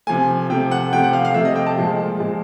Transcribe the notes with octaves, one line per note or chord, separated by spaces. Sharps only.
C3 F3 A3 G#5
C3 F3 A3 G5
F#5
C3 F3 A3 G5
F#5
F5
F5
C3 F3 A3 E5
D#5
G5
A5
A#2 F3 G#3
A#2 F3 G#3